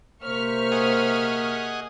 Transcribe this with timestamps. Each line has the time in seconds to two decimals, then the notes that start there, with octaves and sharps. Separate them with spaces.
0.24 C3 A#3 C5 C#6 F6 B6
0.72 G#4 D#5 F#5